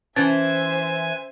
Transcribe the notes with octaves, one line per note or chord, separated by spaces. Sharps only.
E3 C#4 C5 E5 G#5